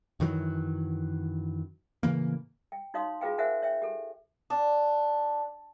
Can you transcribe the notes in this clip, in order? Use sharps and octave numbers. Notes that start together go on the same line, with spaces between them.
F#2 D#3 E3 F#3
A2 C#3 E3 A#3
G5
D#4 F#4 C#5 F5 C6 D#6
F4 F#4 G#4 B4 F5 G5
A#4 C5 E5 F#5 G#5
C#5 E5 G5
G4 A4
D4